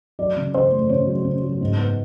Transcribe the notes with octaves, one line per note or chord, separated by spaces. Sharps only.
F#3 D5
C#3
C#3 C5
A3
C#3 C#5
F#3
C#3
F#3
G#2
B3